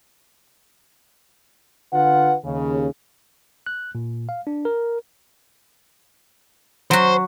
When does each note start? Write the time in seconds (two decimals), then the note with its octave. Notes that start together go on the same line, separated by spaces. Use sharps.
1.93 D3 F4 B4 F#5
2.45 D#2 C#3
3.66 F#6
3.95 A#2
4.29 F5
4.47 D4
4.65 A#4
6.91 F#3 F#4 C5